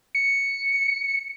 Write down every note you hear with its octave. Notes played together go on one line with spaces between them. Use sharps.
C#7